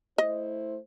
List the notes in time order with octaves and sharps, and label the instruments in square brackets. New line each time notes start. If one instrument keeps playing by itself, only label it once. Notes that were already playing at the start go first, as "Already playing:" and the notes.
[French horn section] A3 E4 C5 [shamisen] D#5